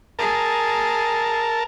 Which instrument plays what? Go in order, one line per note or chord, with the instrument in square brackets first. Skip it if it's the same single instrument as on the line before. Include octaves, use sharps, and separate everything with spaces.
[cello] G#4 [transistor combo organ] A#4 A5